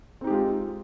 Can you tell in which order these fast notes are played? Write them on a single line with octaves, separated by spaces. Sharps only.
C4 D#4 G4 G#3 F4